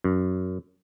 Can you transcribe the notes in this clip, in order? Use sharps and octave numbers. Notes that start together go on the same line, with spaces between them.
F#2